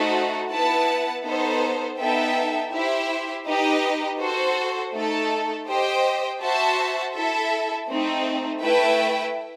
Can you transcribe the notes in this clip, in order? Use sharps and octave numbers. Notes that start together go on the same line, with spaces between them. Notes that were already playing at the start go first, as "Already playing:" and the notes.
Already playing: A3 D#4 F#4 C5 F#5
B3 E4 B4 F#5 A5
B3 D#4 A4 C5
B3 D#4 A4 E5 G5
E4 G4 C5 E5
D#4 G4 B4 D#5
F#4 A4 C5
A3 D#4 A4
G4 C5 D#5 G5
F#4 C5 E5 A5
E4 A4 E5
A3 C4 D#4
A3 E4 B4 E5 G5